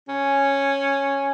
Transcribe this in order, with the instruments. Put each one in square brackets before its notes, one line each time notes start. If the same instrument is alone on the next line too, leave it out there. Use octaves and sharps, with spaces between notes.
[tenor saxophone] C#4